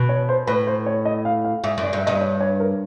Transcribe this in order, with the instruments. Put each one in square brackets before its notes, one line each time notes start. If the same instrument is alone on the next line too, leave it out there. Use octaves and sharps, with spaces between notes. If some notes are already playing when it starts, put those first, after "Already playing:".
Already playing: [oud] B2
[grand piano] C#5
C5
[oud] A2 [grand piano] B4
[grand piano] C5
C#5
D#5
F5
F5
[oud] G#2 [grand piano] E5
[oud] F#2
[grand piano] D5
[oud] G2
[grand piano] E5
[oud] G2 [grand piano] D#5
[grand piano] D5
C#5
C#5
A#4